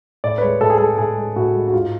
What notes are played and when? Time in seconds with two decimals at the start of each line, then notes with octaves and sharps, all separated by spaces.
0.24 A2 D5
0.38 B4
0.42 G#3 C#5
0.61 A2 A4
0.70 G#4
0.78 G#3 A4
0.98 A2 G#4
1.17 G#3
1.36 A2 F#4
1.54 G#3
1.68 F#4
1.73 G#2 F4